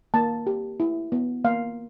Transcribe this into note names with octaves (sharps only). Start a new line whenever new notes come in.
A#3 A5
G4
E4
B3
A#3 F5